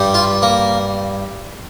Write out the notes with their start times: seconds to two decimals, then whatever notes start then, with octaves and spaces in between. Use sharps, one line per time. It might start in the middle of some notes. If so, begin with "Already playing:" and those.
Already playing: G2 G3
0.14 F4
0.42 A#3